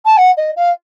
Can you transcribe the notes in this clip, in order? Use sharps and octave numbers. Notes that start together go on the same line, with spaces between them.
A5
F#5
D#5
F5